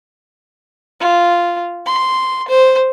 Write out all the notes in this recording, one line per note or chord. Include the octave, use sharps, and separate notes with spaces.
F4
C6
C5